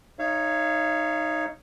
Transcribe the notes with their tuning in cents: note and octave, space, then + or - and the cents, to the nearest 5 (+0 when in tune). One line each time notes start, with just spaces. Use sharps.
D#4 +0 C#5 +0 F5 -40